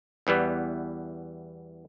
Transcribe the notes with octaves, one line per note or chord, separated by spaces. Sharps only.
E2 E3 G3 B3